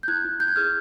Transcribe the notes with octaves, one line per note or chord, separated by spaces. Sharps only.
G6
E4 F#6 G#6
E4
E4 G6
G#6
G#4 F6 G6